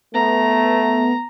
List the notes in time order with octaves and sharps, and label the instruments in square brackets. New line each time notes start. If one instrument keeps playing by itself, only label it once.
[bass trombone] A3 [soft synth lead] B3 [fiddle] A#5